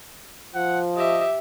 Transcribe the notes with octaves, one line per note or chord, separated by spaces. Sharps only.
F3 F#5
G4 D#5 E5